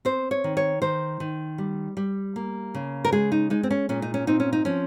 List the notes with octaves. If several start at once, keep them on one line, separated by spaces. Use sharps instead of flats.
C4 C5
C#5
D#3
C#5
D#3 C5
D#3
G3
G3
A#3
C#3
A#4
G#3 G#4
D#4
G#3 D#4
C4
C#4
A#2 C#4
D#4
C#4
C4 D#4
C#4
D#4
F3 C#4